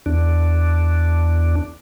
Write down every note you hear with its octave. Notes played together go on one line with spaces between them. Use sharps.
E2 D4